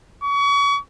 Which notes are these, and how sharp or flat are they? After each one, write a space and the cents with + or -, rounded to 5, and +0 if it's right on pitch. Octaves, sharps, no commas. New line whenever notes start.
C#6 +35